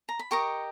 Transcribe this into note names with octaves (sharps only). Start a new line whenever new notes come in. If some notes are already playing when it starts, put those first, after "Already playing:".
A#5
B5
G4 A#4 D#5 C#6